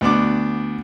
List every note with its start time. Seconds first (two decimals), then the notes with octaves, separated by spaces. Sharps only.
0.01 D2 B3 D4 D6